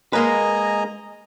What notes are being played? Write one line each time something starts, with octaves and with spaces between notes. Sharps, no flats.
G#3 A#3 B4 D#5 G#5 A#5